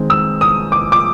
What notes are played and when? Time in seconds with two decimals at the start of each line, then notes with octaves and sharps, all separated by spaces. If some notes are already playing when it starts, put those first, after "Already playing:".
Already playing: D#3 G#3 C4 D#4
0.10 E6
0.41 D#6
0.72 D6
0.92 D6